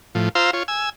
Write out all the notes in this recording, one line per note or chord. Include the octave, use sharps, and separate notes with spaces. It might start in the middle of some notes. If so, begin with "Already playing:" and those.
A2 F3
F4 C5 F5 A#5 C6 E6
F4 C#5
G#5 E6